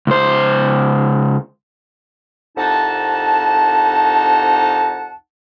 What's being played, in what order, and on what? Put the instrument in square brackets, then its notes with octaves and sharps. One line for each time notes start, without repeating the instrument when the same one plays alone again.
[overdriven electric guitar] C#2 C5
[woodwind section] C2 F2 D#4 F#5 A5